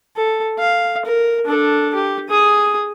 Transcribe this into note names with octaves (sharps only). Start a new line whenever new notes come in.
A4
F5
A#4
D4 A4
G4
G#4 D#6